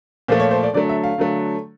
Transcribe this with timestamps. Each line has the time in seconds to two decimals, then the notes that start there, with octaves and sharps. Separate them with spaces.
0.28 A#2 F3 A3 C5
0.40 C#5
0.51 C5
0.63 D5
0.74 D3 F#3 A3 D5
0.89 E5
1.04 F5
1.18 D3 F#3 A3